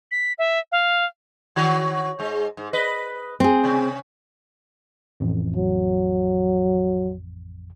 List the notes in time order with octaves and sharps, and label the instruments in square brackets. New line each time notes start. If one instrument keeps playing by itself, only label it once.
[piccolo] B6
E5
F5
[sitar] D#3 F#4 C#5
G#2 G#3
G#2
B4 D#5
[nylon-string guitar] C4 G#4
[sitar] C3 C#4
[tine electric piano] A1 F2
[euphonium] F#3